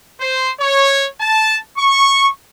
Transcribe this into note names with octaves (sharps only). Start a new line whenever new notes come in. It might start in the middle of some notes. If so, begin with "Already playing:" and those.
C5
C#5
A5
C#6